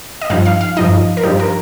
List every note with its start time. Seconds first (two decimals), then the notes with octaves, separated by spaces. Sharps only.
0.21 D#5
0.30 G2 F3 D#4 F5
0.46 F5
0.61 F5
0.77 G2 F3 D#4 D#5
1.17 A#4
1.23 G2 F3 D#4 G4
1.40 A#4